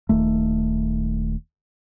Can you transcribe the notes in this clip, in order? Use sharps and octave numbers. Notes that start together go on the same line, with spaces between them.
D#1 D#2 A3